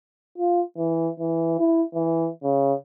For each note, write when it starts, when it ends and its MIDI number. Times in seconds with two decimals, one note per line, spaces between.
0.38 0.62 65
0.77 1.08 52
1.19 1.56 52
1.59 1.82 64
1.94 2.29 52
2.43 2.73 49